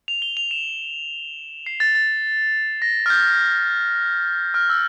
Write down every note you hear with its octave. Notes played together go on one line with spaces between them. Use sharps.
F7
G7
F7
E7
C7
A6
A6
A#6
F6
G6
F6
E6